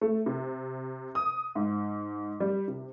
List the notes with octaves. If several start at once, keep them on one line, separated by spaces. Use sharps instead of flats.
A3
C3
D#6
G#2
G3
C3